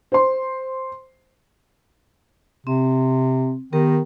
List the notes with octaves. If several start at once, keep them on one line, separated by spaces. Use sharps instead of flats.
C5 C6
C3 C4
D#3 B3 G4 A#4